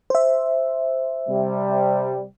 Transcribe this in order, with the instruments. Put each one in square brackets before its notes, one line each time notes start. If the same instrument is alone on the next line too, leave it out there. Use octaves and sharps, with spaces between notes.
[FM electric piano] C5 E5
[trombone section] C3 G3